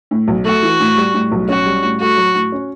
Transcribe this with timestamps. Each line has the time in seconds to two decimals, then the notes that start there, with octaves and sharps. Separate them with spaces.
0.11 A2
0.28 B1
0.45 A3 F#4
0.63 E3
0.80 A2
0.97 G3
1.14 A2
1.32 B1
1.49 C#4 F#4
1.66 G3
1.83 A2
2.01 A3 F#4
2.17 F#3
2.35 A2
2.52 C#4